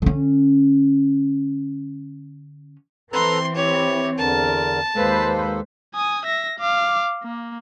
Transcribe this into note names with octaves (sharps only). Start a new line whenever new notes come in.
D3 C#4
E3 C4 A4 B4 A#5 C6
E4 G4 C#5
E2 D3 A#4 A5
D#2 G#3 A#3 A4 B4 C5
G#5 D#6
E5 A#6
F5 D6
A#3